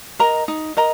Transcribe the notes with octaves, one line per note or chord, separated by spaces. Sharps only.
A#4 D#5 A#5
D#4
A#4 D#5 A#5